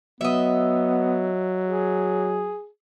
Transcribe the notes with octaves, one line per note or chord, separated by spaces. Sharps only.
F#3 B3 D#5 E5
G#4